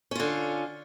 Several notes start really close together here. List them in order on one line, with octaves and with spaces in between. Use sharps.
C#4 F4 D3